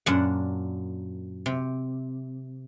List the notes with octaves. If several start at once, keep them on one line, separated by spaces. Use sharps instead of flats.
F#2 A#2 D4 F#5
C3